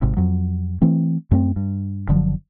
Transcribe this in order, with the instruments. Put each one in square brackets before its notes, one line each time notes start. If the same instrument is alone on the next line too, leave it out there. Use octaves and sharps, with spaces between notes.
[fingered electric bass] G#1 G#2 C3
F2 F#3
E3 A3 C4
F#2 A3 B3 C4
G2
F#1 D3 F3 F#3